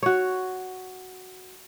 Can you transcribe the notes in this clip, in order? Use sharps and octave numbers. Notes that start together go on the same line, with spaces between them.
F#4 C#5